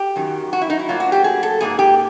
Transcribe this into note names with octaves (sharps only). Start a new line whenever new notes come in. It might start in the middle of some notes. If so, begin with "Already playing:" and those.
Already playing: G4
F#2 D#3 F#3
F#4
E4
D#4
E4
A2 F#3 A#3 F4
F#4
G4
G#4
A4
G#2 F3 A#3 G#4
G4